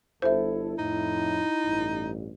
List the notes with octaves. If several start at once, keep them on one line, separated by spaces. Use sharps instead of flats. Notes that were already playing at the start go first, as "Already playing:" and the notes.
G1 E4 A4 C5 E5
F2 A2 D#4
A1 G2